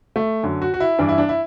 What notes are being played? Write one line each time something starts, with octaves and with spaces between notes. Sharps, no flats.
A3
F#2 D3
F#4
F#4
E4
G2 E3 D4
E4
D4
E4